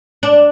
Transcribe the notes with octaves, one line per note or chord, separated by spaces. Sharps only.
D4